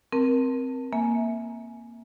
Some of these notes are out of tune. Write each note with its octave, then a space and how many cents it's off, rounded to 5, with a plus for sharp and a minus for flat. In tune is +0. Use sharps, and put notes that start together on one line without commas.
C4 +0 A#4 +20 A5 +20
A#3 +0 E5 -15 G#5 +20